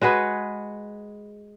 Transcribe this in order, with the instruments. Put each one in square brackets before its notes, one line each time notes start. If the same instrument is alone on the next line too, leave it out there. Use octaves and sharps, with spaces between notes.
[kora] G#3 F#4 G#4 B4